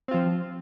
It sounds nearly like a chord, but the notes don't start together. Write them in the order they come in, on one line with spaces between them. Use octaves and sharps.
C4 F4 F3